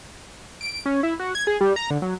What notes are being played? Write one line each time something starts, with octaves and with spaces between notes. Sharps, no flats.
D7
C#4
E4
F#4
G#6
G#4
G3
A#5
D3
F#3